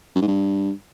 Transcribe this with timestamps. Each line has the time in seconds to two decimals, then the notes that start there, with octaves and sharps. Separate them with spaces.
0.15 F#2
0.22 G#2
0.28 G2